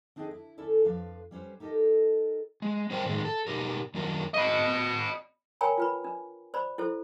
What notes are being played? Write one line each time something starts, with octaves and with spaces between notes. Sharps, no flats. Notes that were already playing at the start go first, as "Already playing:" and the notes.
C4 D4 D#4 G#4 D#5 G5
E4
D2 C#4 E4 A4 D5
F2 F3 D4 B4 F5
G3 C#4 B4 C5
D#4 G4 A4 A#4 D#5
G#3
G3 D4 A#4 C5 D5 G5
A2 D#3 G#3 D#4
A4
B2 D#4 G4 A#4
F#2 D#3 F#3 D4 A#4
D#5 B5
A#4 C#5 G5 G#5 A#5 B5
F4 B4 B5
D4
C5 D5 B5
E4 A4 C5